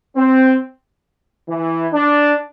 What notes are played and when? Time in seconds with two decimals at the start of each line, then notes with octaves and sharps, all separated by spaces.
0.17 C4
1.48 E3
1.94 D4